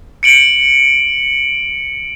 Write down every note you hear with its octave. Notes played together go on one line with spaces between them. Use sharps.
C#7 D7 F#7